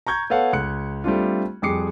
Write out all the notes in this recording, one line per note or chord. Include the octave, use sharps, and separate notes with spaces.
A#5 C#6 G6 G#6
B3 A4 C#5 F5 F#5
C#2 F#6 C#7
G3 A3 C4 D4 F4
F2 G3 G#4 D6 C7 C#7